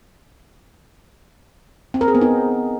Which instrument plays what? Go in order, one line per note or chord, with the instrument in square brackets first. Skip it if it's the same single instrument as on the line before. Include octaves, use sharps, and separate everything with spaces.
[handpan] C4
A#4
G#4
B3
D#4